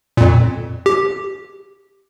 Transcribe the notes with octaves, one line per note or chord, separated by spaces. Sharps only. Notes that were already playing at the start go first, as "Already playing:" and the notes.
F2 A#2
G4